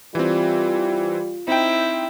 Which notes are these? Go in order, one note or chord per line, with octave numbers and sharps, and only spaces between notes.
E3 G3 C4 F4
C4 D#4 E4 G5